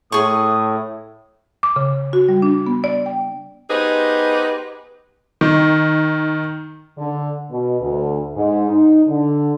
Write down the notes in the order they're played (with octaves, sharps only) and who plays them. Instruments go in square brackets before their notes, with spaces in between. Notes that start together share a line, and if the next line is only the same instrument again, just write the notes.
[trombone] A2 [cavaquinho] G#4 C#6 [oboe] D#6
[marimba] D6
C#3
F#4
G3
D4
B3
D5
G5
[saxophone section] B3 D#4 G4 G#4 B4 C5
[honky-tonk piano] D#3
[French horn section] D3
B2
D2
G#2
D#4
D3